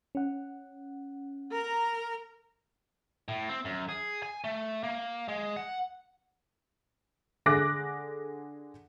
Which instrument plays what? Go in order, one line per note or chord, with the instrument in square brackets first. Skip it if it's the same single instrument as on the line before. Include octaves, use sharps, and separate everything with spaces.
[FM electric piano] C#4 F#5
[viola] A#4 A#5
[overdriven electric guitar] A2
C4
F#2
G#4
G#5
A3
A#3
G#3
F#5
[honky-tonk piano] D3 G#4 D6 F#6 A#6